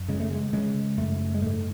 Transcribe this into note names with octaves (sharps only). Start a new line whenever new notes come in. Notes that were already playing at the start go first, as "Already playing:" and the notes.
Already playing: F#2
C#3 G#3
A3
G#3
C#3 G#3
F#2 A3
G#3
G#2 A3